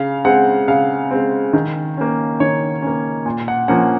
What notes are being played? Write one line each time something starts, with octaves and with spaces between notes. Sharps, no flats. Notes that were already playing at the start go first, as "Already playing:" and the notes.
Already playing: C#3 F5
G#3 C4 F#5
C#3 F5
G#3 C4
D#3
A#3 C#4
D#3 C#5
A#3 C#4
A#2
F#5
F3 A#3 C#4 F#5